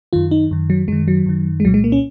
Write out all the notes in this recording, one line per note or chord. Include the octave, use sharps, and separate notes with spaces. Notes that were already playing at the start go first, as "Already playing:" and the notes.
F#2 D#3 F4
D#4
F#2 D#3
F#3
F#2 D#3 G#3
F#3
F#2 D#3
G#3
C2 A#2 F#3
G#3
A#3
C#4